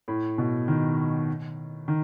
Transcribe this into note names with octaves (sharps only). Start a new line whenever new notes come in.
A2
B2
D#3
D#3